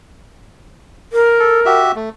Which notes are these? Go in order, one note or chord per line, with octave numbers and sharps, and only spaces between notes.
A#4
A4
F#4 G4 E5
A3